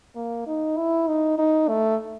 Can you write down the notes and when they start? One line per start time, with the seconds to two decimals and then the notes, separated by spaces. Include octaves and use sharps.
0.15 A#3
0.47 D#4
0.77 E4
1.07 D#4
1.38 D#4
1.68 A3